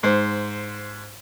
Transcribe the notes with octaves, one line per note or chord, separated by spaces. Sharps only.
G#2 C5